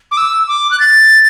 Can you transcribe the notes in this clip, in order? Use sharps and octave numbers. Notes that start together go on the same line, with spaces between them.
D6
E6
D6
F#6
A6